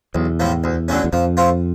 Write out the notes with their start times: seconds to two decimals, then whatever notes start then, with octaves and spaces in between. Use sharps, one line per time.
0.15 B1 E2
0.40 A2 F3 A3
0.64 D2
0.88 D3 F#3 A3 C#4
1.04 E2
1.13 F2 F3
1.37 A3 C4 F4